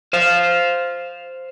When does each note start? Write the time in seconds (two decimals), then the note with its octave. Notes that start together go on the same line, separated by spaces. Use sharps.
0.13 C5 F5